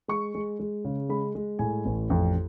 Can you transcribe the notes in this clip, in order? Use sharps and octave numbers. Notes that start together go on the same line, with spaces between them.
G#3 C#6
G#3
G#3
C#3
G#3 B5
G#3
A2 G#5
A1
F2